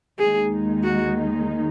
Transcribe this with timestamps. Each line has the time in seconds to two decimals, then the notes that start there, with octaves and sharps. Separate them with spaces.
0.19 D#2 D#3 G#3 D#4 G#4
0.84 F#4